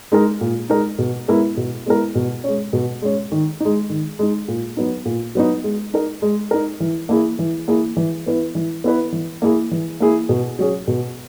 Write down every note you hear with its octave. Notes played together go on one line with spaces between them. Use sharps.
G#3 D#4 A#4
A#2
G#3 D#4 A#4
B2
G#3 B3 E4 A#4
B2
G#3 B3 E4 A#4
B2
G#3 C#4
B2
G#3 C#4
D#3
G#3 D#4
D#3
G#3 D#4
A#2
F#3 B3 D#4
A#2
F#3 B3 D#4
G#3
D#4 A#4
G#3
D#4 A#4
E3
A#3 E4 G#4
E3
A#3 E4 G#4
E3
B3 E4 B4
E3
B3 E4 B4
E3
A#3 E4 G#4
E3
A#3 E4 G#4
B2
F#3 C#4 G#4
B2